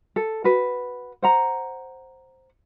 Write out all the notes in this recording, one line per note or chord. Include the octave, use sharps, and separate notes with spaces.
A4
F#4 B4
C5 F#5 A#5